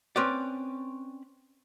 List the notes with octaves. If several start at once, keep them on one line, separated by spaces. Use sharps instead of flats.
C4 C#4 B4 D5